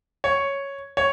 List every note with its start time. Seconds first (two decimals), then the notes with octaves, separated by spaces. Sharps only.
0.24 C#5
0.97 C#5